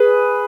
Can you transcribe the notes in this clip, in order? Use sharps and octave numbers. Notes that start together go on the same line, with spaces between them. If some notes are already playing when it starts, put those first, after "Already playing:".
Already playing: G#4 B4